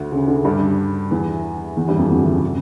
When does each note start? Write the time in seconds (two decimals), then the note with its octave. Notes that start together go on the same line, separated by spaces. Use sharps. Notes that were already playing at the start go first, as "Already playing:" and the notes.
Already playing: D2 D3
0.12 C#3
0.28 D3
0.34 C#3
0.45 G2 G3
1.11 E2 E3
1.77 E2 E3
1.87 G2 G3
1.99 F2 F3
2.10 E2 E3
2.21 D2 D3
2.32 C#3
2.42 C#3